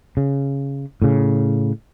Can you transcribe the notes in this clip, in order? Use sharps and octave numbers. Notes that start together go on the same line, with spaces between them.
C#3
A2 C#3